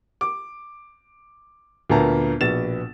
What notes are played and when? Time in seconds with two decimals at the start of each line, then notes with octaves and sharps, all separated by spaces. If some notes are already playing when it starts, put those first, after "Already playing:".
0.21 D6
1.90 D2 A#2 A#3 B3 A5 A#5
2.40 A#1 B2 B3 A6 E7